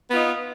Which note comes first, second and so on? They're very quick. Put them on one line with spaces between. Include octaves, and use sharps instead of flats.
B3 F4 D#4